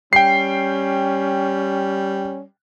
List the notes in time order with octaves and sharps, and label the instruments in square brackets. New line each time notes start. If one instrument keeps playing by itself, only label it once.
[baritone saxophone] G3 [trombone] C#4 [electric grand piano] G5 C7